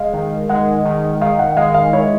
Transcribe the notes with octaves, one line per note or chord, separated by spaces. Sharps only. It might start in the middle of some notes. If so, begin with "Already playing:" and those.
Already playing: G#3 F5
D#3
G#3 F#5
D#3
D#3 F5
F#5
G#3 F5
F5
E4 C#5